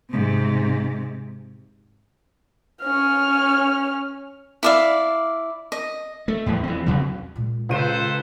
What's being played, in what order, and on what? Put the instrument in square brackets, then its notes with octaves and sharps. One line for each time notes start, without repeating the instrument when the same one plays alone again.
[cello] G#2 C3
[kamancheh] C#4 F6
[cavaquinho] E4 D5 F5
D#5
[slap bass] A3
E2 A2
E3 C4
E2 C#3 F#3
[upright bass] A#2 G#3
[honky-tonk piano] C#2 D#7 [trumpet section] A4 B4 C5